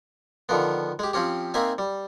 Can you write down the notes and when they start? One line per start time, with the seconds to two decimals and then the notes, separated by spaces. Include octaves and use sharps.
0.49 D3 D#3 F3 B3
0.99 G#3 G4
1.13 F3 C4 C#4 G4
1.54 A#3 C4 D#4 E5 G#5
1.78 G3